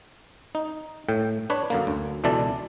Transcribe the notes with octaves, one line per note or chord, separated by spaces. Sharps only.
D#4
A2 G5
D4 B4 C#5
F#2 D3 A#3
D2
C#2 B2 E3 D4 A4 D5